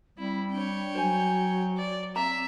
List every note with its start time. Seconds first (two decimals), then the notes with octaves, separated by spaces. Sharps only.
0.18 G3 C4 E4
0.53 D4 C#5 G5
0.95 F#3 F#4 C5 G#5
1.77 D5
2.16 C4 E5 A#5